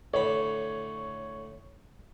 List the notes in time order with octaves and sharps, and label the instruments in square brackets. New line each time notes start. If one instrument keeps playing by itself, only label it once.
[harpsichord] A2 D3 B5 [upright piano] C#5